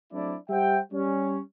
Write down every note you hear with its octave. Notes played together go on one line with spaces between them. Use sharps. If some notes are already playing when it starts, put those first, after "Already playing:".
F#3 A3 C4 D4 E4 D5
G3 C5 E5 F#5 G5
G3 C#4